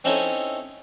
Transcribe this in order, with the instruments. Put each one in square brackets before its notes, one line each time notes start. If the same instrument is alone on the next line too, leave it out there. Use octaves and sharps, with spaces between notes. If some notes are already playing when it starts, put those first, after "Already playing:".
[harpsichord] C4 C#4 D#4 E4 A4 C#5